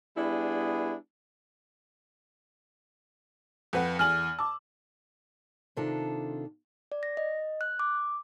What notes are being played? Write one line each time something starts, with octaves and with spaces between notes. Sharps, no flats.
G3 B3 D4 E4 G#4
F2 B4 F#5
E2 G#5 F6 F#7
A5 D6 E6
C3 D#3 D4 F4 A4
D5
A#6
D#5
F#6
D6